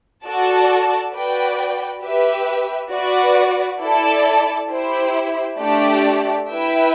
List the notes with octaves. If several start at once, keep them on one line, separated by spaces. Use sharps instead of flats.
F#4 A4 D5 A5
F#4 B4 D5 G5
G4 B4 E5
F#4 B4 D5
E4 A4 D5 A5
E4 G4 C5
A3 D4 G4 D5
E4 B4 E5 G5